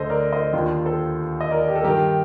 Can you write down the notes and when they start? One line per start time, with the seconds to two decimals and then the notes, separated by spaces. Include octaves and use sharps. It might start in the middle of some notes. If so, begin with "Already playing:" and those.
Already playing: D2 D3 A4 C5 D#5
0.10 A#4 D5
0.33 C5 D#5
0.53 D#2 D#3 D4 F4
0.86 A4 C5
1.41 D#5
1.51 A#4 D5
1.68 G4
1.75 A4
1.84 G2 D#3 G4 A#4